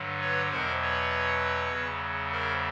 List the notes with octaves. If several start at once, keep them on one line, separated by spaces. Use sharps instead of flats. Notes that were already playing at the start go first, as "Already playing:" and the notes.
Already playing: G2 D3 F#3
B4 C#5
E2 B2 F#3 A#4 C5
B4 C#5
E2 C#3 F#3
A#4 C5